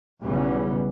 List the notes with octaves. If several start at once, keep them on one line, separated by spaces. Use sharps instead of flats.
B1 E2 C#3 E3 G3 B3